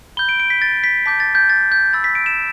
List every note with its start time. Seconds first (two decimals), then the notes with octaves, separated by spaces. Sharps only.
0.17 B5 G6 G7
0.29 D7
0.40 D7
0.50 B6
0.62 A6
0.84 B6
1.06 A5 D6 G6 B6
1.20 A6
1.35 G6
1.50 A6
1.72 G6
1.93 B5 E6 G6 A6
2.04 B6
2.15 D7
2.26 E7